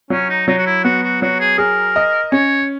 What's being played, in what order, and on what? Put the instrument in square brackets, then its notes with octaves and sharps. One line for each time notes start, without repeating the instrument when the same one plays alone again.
[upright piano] F#3 [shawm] C#4
[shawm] D#4
[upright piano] F#3 [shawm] D#4
[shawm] F#4
E4
[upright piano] B3 [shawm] F#4
[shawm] F#4
[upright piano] F#3 [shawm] F#4
[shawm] G#4
[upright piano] G#4 [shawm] A#4
[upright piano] D#5
[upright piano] C#4 [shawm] C#5